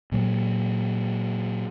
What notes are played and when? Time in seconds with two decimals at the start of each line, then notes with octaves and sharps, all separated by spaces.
0.12 A#2 F#3